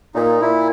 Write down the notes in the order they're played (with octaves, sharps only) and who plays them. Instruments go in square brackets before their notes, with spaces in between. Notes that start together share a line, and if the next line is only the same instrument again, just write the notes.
[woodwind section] A#2 [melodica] D#4
[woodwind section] A#2 [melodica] E4